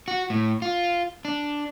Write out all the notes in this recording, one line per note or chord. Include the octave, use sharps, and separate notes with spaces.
F#4
A2
F4
D4